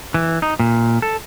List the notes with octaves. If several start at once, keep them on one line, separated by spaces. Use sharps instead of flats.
E3
D#4
A#2
A4